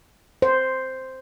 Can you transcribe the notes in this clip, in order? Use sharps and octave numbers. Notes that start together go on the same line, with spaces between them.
C5